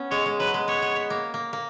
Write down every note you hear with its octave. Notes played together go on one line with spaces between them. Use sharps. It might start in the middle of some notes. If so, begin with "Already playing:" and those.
Already playing: B3 C#4
G#3 C#5
G#3
F#3 B4
G#3
B3 C#5
B3
B3
A#3
A#3
A#3